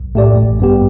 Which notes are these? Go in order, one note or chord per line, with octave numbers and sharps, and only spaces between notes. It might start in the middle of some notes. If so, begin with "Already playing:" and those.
Already playing: B1
A2 A3 G4 D5
A1
G2 G3 B3 G4